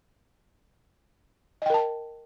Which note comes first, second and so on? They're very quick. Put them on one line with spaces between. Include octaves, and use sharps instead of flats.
D#5 G5 A#4 A5